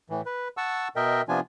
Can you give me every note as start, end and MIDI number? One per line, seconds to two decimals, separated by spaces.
0.10 0.21 45
0.10 0.21 52
0.26 0.48 71
0.57 0.88 78
0.57 0.88 81
0.57 0.88 85
0.57 0.88 88
0.96 1.22 47
0.96 1.22 70
0.96 1.22 75
0.96 1.22 76
0.96 1.22 79
1.29 1.40 48
1.29 1.40 53
1.29 1.40 59
1.29 1.40 62
1.29 1.40 65
1.29 1.40 80